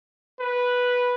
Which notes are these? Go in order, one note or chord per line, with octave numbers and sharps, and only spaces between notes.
B4